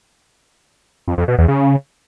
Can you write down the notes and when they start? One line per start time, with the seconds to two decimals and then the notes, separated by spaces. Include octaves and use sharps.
1.08 F2
1.18 F2
1.28 B2
1.38 E2
1.48 C#3